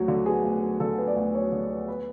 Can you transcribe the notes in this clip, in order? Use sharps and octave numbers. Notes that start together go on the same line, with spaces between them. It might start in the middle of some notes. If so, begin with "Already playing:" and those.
Already playing: D2 F#3 F#4
D3
B3 G#4
D2
F#3
D3 A4
B3
D5
D2
F#3 C#5
D3
B3
B4